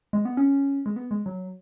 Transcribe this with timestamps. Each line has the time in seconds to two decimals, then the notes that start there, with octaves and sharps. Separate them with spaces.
0.13 G#3
0.25 B3
0.37 C#4
0.86 G#3
0.96 B3
1.11 G#3
1.26 F#3